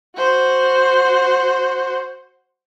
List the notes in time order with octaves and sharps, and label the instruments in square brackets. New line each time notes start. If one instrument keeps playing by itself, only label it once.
[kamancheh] F#4 C5